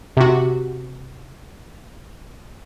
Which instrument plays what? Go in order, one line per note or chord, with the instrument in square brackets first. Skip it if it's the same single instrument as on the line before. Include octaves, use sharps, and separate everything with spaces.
[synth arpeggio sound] C3 F#4